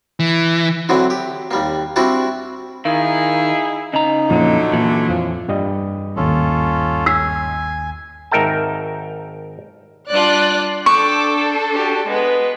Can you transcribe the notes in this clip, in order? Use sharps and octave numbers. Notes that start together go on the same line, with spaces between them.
E3
D3 F#3 C4 D4 E4
G4
D#2 G3 A#3
G3 C4 D4 E4 F#4 A5
D#3 D#4 E4 G#4 F5
C#3 D#4 A#5
F2 A#2 D3 F3 F#3 A3
A#2 E3
F2 F3
G2 G3 D#5
G#1 D#2 C#4 F4 A4
G#5 E6
G#1 D#4 A#4 E5 G5 A5
G3 D4 F4 D5 F#6
D4 A4 G5 C#6 D6 E6
F#4 G4
G#3 B3 B4